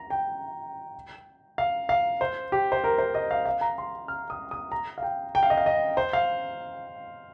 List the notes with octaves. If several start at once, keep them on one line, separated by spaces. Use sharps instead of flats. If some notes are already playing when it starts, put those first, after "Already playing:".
Already playing: A#5
G5
F5
F5
C5
G4
C5
A#4
C5
D#5
F5
F5
A#5
C6
F6
D#6
D#6
A#5
F5
G5
G5
F5
D#5
F5
D#5
C5
F5